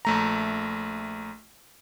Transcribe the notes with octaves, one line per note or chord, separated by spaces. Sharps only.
A#1 A3 A#5